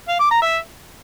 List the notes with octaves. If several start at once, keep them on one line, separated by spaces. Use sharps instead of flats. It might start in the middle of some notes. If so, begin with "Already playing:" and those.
F5
D6
A#5
E5